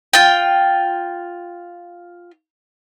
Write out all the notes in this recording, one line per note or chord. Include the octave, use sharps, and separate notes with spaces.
F4 G5